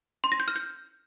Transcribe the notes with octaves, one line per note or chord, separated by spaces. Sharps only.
C6
A#6
G6
F6
G6